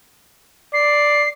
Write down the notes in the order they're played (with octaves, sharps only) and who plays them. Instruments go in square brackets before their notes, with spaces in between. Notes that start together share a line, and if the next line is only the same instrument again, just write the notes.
[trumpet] D5 [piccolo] C7